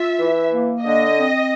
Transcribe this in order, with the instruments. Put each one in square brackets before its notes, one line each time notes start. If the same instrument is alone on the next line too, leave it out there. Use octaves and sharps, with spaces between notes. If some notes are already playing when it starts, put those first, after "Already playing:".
Already playing: [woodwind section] F4 [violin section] E5
[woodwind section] E3
A#3
[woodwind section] D3 [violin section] D#5
[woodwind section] C4